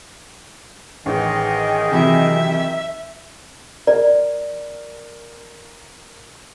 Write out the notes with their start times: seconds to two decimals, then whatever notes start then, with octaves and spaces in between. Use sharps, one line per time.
1.06 A1 D#3 G#4 D#5
1.92 C3 E3 F#3 E5
3.87 A#4 D5